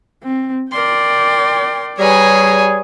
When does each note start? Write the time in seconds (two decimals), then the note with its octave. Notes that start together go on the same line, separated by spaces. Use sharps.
0.23 C4
0.72 A#4 D5 G5 C6
1.99 G3 G#4 B4 C#5 G#5 A#5